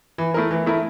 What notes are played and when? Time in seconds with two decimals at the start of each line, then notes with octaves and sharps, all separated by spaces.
0.18 E3
0.34 A3 E4 A#4
0.51 E3
0.66 A3 E4 A#4